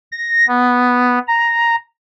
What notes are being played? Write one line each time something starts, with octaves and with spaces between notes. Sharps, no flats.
A#6
B3
A#5